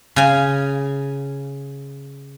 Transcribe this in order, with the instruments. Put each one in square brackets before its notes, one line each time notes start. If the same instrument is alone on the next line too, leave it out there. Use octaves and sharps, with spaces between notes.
[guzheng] C#3 G#5